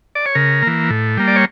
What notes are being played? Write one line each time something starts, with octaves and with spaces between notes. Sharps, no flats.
D5
C#5
C#3 A#4
E3 A#3
A2
G3 A#3
D5
C#5